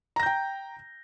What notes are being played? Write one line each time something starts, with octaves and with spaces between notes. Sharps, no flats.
G5 A#5 G6 A#6